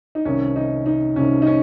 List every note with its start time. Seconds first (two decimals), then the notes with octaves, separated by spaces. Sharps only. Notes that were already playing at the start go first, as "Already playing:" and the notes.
0.15 D#4
0.25 C2 C3 D#3 C#4
0.56 D#4
0.86 D#4
1.16 C2 C3 D#3 C#4
1.42 D#4
1.47 C#4